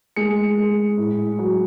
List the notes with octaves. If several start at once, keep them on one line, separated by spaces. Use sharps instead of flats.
G#3 C#7
G#3
A2
F#3